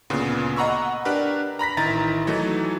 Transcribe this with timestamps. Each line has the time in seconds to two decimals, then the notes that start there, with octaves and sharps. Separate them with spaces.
0.10 D2 A#2 C#3 B3
0.56 D#5 F#5 A#5 B5 C#6 E6
1.05 D4 G4 A#4 B4
1.59 A#5 B5 A#6 B6
1.77 A1 D#3 E4 A#5 A6
2.27 E3 F#3 A3 D#4